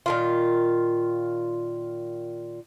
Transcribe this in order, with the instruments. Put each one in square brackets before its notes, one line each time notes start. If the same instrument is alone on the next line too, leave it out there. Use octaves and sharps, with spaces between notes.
[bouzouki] A#2 D#3 F4